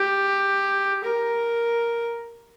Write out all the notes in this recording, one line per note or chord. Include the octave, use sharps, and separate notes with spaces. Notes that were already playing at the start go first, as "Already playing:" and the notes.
Already playing: G4
A#4